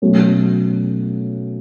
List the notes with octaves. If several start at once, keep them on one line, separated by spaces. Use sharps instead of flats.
B2 F#3 A3 C#4